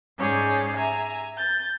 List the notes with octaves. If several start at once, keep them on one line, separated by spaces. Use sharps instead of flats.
G#2 C#4 G#4 C#5 D5 G6
E5 G#5 A#5
G6 A6